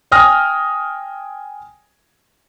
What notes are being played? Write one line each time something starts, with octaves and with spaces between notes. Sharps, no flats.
G5 G#5 D#6 F6 A#6